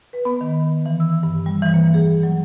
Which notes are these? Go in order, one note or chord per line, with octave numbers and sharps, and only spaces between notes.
B4
B3
D#3
E3
E6
G2
G3
E3
A#3
G#4
F#3